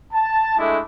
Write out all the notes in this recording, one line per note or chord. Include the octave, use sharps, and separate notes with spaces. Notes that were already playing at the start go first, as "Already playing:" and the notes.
A5
G#3 A3 D4 E4